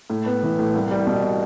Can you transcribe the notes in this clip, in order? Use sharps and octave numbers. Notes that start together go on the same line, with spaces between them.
A2
B3
E3
A2
C2
G3
B2